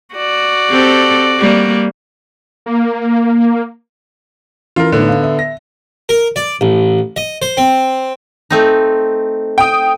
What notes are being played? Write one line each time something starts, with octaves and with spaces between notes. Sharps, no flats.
F#4 D5
C4 G4 A4
G3 A#3
A#3
E3 C#4 E4 F4 A#4
A2 D3 B3 D#4
F5
E5
A#6
A#4
D5
A1
D#5
C5
C4
A3 C4 D#4
G5 D#6